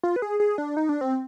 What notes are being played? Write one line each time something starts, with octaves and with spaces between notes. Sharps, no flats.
F4
B4
G#4
G#4
D4
D#4
D4
C4